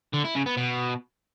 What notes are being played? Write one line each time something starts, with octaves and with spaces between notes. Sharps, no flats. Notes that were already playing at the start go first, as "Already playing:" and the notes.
D3
E4
C#3
B3
B2